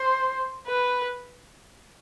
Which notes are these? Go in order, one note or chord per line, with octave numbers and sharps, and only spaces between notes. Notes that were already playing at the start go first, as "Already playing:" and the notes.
Already playing: C5
B4